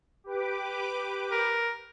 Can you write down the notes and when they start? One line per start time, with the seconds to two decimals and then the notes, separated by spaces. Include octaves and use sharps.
0.24 G4 B4 D6
1.32 A#4